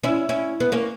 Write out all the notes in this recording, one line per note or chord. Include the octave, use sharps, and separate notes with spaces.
C#4 E4
C#4 E4
B3
A#3 C#4